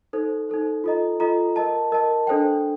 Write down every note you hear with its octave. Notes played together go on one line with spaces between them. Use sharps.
D#4 A4 C5
D#4 A4 C5
F4 A4 D#5 A#5
F4 A4 D#5 A#5
A#4 D#5 A5
A#4 D#5 A5
D4 A4 C5 G5